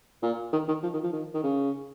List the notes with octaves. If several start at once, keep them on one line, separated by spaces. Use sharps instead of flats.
A#2
D#3
D#3
F3
D#3
F3
D#3
D#3
C#3